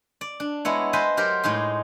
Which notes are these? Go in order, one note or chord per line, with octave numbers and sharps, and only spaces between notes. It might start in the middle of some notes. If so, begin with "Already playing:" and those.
D5
D4
G#3 B3 E4 C#5
B4 C5 D#5 G#5 A5 B5
F#3 G4 A#4 C5
A2 G#3 D#4 C6